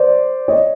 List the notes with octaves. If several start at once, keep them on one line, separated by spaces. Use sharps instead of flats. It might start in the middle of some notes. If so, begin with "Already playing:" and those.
Already playing: C5 D5
C#5 D#5